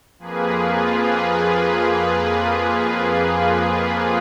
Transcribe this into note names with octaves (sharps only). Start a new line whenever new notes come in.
F2 F3 A#3 G#4 B4
F4 G#4
G#4 B4